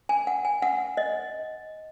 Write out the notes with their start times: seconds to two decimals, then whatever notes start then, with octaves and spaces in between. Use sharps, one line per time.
0.09 G#5
0.27 F#5
0.45 G#5
0.62 F#5
0.97 D#5